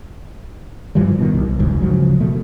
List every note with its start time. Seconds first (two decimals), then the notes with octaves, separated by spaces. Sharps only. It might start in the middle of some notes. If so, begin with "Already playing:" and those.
0.95 G2 E3 F3 G3
1.18 B2 D#3
1.34 C2
1.59 F#1 D2 G#2
1.82 C#3 F3 F#3
2.20 B2 A3